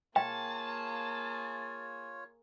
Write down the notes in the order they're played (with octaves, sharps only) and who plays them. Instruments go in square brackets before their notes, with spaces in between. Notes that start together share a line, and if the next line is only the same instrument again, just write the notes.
[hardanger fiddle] A#3 G#4 [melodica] F4 C#5 [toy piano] G5 [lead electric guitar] A5